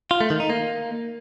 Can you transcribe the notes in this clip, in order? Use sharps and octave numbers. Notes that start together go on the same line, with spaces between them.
F4
A3
D#3
D#4
A#3